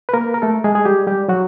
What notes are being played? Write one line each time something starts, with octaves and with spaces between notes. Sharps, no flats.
B4
A#3 A#4
A#4
A3 A4
G#3 G#4
G#4
G3 G4
G3 G4
F#3 F#4